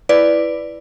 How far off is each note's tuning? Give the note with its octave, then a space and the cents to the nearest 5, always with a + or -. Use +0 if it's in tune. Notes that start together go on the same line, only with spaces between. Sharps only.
E4 +10 B4 +5 D5 +0